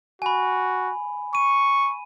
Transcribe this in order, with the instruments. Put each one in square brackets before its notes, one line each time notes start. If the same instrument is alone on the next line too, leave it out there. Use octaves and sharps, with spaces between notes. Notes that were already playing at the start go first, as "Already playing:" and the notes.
[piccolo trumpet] F#4 [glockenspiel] G#5 B5
[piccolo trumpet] C#6 [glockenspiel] D#7